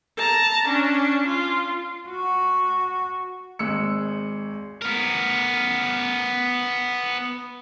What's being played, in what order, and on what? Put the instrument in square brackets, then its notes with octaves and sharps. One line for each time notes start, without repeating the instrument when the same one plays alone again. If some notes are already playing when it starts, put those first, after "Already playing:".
[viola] A5 A#5
C#4 D4
F4
[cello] F#4
[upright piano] G#1 G#3 E6 C#7
[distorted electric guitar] B3 A#4